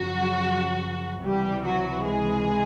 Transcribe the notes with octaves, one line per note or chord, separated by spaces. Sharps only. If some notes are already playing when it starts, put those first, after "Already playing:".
Already playing: F#2 C#3 F3 F#3 F#4
C#2 C3 E3 G3 G4
F#3 F#4
G#3 G#4